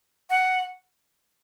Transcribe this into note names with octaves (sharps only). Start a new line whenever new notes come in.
F#5